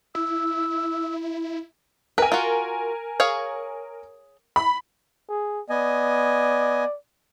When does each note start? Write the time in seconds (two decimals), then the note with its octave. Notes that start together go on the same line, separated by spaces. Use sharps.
0.15 E4 E6
2.18 A#4 B4 G#5
2.32 F4 F#4
3.20 G#4 C#5 F5
4.56 B5
5.29 G#4
5.70 B3 D5 D#5 G#5